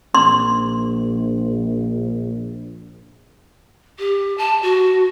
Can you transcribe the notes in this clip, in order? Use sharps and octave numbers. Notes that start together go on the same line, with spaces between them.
A#1 C6
G4
A5
F#4